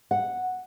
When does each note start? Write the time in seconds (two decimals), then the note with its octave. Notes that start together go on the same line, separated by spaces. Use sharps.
0.11 F#5